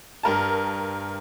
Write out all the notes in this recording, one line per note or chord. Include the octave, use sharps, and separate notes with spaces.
G2 A#4 A5